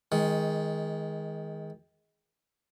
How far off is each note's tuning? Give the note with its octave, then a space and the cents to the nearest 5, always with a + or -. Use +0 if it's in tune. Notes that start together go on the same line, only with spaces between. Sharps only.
D#3 +25 G#3 +0